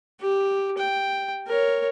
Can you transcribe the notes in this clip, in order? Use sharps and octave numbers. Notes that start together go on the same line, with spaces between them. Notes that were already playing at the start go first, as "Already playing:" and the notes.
G4
G5
A#4 C#5